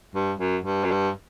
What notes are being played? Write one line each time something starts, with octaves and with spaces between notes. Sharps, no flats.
G2
F#2
G2
F#2
G2